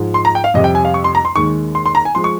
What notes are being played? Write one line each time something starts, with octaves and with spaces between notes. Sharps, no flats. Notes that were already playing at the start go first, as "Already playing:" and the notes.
Already playing: G#2 F3 G#3
C6
A#5
G5
F5
F2 C3 G3 D#5
G5
G#5
F5
C#6
C6
A#5
C6
D#2 D#3 G#3 C#6
C6
C6
A#5
G#5
F3 G#3 C6
C#6